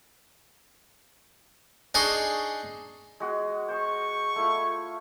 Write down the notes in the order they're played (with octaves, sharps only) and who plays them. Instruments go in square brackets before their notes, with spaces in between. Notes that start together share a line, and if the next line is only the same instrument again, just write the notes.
[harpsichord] D4 D#4 G#4 G#5 C6 C#6
[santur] G#3 F#4 G#4
[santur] G#4 C5 [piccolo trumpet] C#6
[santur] A3 E4 F4